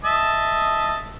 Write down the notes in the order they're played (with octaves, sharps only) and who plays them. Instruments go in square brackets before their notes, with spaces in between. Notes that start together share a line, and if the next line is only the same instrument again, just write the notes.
[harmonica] D#5 E5 A5